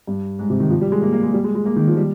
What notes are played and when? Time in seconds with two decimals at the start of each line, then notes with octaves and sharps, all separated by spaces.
0.07 G2
0.39 G#2
0.50 C3
0.60 D#3
0.70 F3
0.81 G3
0.92 G#3
1.02 A#3
1.13 A#3
1.23 G#3
1.34 G3
1.44 G#3
1.55 G#3
1.65 A#3
1.76 D#3
1.88 F3
1.97 G3